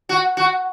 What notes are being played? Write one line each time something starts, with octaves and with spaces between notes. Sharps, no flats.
F#4
F#4